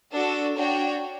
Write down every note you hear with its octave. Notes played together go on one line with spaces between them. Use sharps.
D4 F#4 A4
D4 F#4 C#5 G5